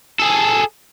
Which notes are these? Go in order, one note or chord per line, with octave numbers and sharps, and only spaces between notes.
G#4 A4